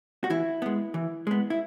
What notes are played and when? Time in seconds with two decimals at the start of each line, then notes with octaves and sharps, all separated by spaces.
0.24 F#4
0.30 E3 E4
0.62 G#3 B3
0.94 E3
1.27 G#3 B3
1.50 E4